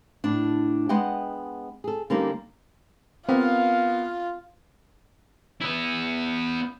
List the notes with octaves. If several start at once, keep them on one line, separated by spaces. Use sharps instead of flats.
A2 D4
G#3 B3 D#5 F#5 G5
G#4 A4
D3 G3 A#3 C#4 D#4
B3 C4 F4 A#4 F5
B3 E4